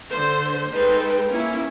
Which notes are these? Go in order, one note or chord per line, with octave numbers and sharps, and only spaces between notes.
D3 C5
G#3 D#4 A4 B4 C5 G5
A#3 C#4 E4